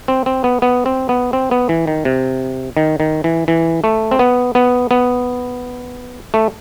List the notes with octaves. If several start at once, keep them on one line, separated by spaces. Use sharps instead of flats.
C4
C4
B3
B3
C4
B3
C4
B3
E3
D#3
C3
D#3
D#3
E3
E3
A3
C4
B3
B3
B3
A3